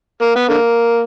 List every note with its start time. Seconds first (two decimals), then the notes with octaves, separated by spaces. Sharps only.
0.22 A#3
0.35 B3
0.49 D3 A#3